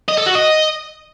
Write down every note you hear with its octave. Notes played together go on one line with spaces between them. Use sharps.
D#5
A4
F#4
D#5